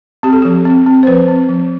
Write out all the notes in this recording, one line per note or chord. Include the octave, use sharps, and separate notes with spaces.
C4 G4
A4
F3 G4
C4
C4
C5
F3 B4
C4
F3